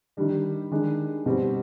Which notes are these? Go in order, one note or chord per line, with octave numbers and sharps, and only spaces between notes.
D#3 G3 D4
D#3 G#3 D4
B2 G3 C4